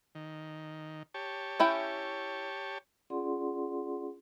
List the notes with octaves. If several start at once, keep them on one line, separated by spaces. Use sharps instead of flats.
D#3
G4 C#5 A5
C#4 E4 G5
C#4 F4 G#4 D5 F#5 C6